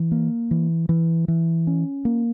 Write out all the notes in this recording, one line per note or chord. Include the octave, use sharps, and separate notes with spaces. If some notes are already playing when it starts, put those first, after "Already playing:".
Already playing: E3
A#3
E3
E3
E3
C#4
A#3